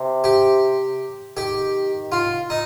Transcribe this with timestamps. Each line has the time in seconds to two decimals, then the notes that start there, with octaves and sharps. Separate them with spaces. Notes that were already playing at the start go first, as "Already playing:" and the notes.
Already playing: C3
0.24 G4
1.37 D#3 G4
2.12 F4
2.50 D#4